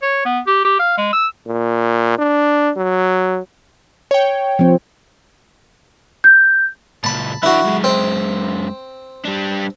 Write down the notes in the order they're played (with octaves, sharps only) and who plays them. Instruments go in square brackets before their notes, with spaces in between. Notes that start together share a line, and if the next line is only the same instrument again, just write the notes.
[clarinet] C#5
B3
G4
G4
F5
G#3
E6
[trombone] A#2
D4
F#3
[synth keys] C#5 G5
[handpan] F3 C4
[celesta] G6
[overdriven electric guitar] C#2 A#2 [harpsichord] A5 B5
[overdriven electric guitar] E3 D4 [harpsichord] E4 F#4
[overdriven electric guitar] F#2 G#3
[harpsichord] C4
[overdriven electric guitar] G3 D4